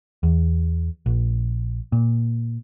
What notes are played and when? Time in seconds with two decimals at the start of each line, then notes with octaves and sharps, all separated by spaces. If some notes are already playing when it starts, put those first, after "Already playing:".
0.23 E2
1.06 A#1
1.92 A#2